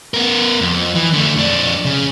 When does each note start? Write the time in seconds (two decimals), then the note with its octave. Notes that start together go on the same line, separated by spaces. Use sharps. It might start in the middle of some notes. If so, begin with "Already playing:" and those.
0.14 B3 A#4
0.62 F2
0.95 E3
1.13 D3 A3
1.37 F2 D4
1.86 C#3